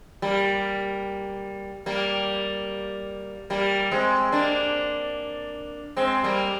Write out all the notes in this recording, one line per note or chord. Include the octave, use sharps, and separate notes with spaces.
G3 A#3
G3 A#3
G3 A#3
G#3 C4
A#3 D4
G#3 C4
G3 A#3